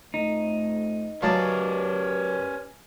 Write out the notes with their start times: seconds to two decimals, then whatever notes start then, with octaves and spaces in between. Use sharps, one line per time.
0.14 F2 A3 D#4
1.22 C#3 F#3 C#4 G4 A#4 B4 D5 A5